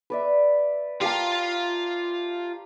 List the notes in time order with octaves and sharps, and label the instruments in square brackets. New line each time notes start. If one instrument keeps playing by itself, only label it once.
[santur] B4 D5 E5
[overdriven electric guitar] F4 F5 [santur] G4 A#4 A5